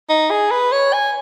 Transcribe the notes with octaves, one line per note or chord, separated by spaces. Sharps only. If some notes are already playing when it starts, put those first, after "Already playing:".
D#4
G#4
B4
C#5
G#5